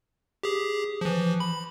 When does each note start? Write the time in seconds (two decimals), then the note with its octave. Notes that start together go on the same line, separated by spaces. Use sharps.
0.43 G4 G#4
1.01 E3 F3
1.40 B5